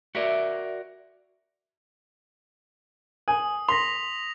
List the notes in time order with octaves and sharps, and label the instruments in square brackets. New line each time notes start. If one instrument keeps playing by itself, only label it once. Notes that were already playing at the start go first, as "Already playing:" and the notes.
[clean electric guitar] F#4 A#4 D5 [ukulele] E5
[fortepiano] G#5 [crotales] D#6
[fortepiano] C6 [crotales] A#6 B6 F7